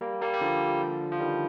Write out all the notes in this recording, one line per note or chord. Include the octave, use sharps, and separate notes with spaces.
G3 A#3
G3 A#3
G3
D3 F3
F3
D#3 G3